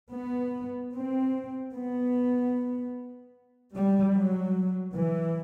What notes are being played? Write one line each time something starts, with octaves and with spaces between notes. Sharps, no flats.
B3
C4
B3
G3
F#3
E3